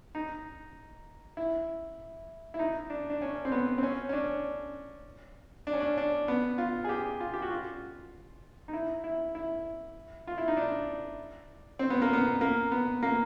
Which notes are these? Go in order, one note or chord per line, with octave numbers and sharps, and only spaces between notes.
D#4
E4
E4
D#4
D4
D4
C#4
C4
B3
C4
C#4
C#4
D4
D4
C#4
D4
D4
B3
F4
G#4
G4
F4
G4
F#4
F4
D#4
E4
E4
E4
F4
E4
D#4
D4
C4
B3
A#3
B3
A#3
B3
A#3